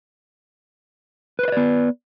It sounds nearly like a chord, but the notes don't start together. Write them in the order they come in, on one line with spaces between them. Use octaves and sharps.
B4 C5 D#5 D5 B3